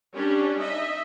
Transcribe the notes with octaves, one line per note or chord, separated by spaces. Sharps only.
G3 C#4 D4
D#4 D#5 E5